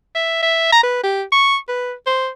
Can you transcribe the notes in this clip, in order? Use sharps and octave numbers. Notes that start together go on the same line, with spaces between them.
E5
E5
A#5
B4
G4
C#6
B4
C5